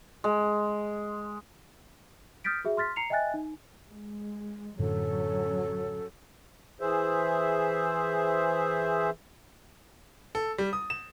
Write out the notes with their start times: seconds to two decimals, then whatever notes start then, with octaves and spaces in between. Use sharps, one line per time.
0.24 G#3
2.44 D#6 F6 G6 A6 B6 D7
2.65 F#4 G#4 E5
2.77 C6 F6 A6 B6
2.96 A#5 C7 C#7 F7
3.10 D#5 E5 G5 G#5 F#6 A6
3.34 D#4
3.89 G#3
4.79 F#2 A2 D3 F#3 C#4 A4
6.81 E3 G#4 C5 E5
10.35 A4
10.58 G3
10.73 D#6
10.90 E7